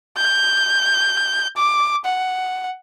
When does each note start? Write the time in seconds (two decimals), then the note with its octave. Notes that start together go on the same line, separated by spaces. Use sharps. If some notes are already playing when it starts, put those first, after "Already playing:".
0.17 G6
1.57 D6
2.05 F#5